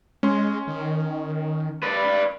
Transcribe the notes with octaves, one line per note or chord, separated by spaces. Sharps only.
G#3 C#4 C6
D#3
B4 D5